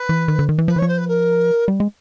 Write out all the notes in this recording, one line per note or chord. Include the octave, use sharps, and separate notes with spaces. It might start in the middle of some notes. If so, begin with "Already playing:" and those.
Already playing: B4
E3
D#3
D3
D#3
E3
F3 B4
E3 C#5
F3
C5
B4
A#4
G3
G#3